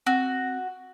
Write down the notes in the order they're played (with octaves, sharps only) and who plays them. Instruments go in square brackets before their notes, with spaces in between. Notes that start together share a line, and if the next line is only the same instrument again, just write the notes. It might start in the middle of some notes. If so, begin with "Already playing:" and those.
[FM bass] C4 [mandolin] F#4